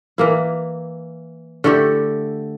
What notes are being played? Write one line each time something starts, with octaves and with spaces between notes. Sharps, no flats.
E3 A#3 E4
D3 A3 E4 G4